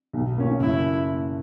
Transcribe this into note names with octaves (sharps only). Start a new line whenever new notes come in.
B1
A#2 A#3 C#4
F#1 E4